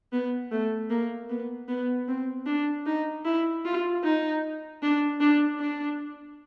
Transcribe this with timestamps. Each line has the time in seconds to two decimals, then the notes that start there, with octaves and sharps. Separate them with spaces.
0.13 B3
0.52 A3
0.90 A#3
1.30 B3
1.68 B3
2.09 C4
2.47 D4
2.86 D#4
3.25 E4
3.65 F4
4.04 D#4
4.83 D4
5.21 D4
5.60 D4